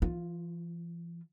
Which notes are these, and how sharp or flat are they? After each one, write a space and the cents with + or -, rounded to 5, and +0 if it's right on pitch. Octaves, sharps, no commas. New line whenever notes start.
E3 +45 F4 +0